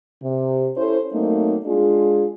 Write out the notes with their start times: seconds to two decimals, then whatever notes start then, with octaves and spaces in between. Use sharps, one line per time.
0.22 C3
0.77 C#4 E4 A4 C5
1.12 F#3 A3 A#3 C4 D#4
1.65 G#3 D4 F4 G#4